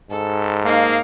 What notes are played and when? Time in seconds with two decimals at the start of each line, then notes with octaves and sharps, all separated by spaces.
0.11 G#2 A4
0.66 A#3 D#4 F5